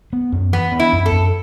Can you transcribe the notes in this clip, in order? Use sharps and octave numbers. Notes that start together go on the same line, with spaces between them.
B3
F#2
E3 B3
B3
E4
F#2
A4
F#2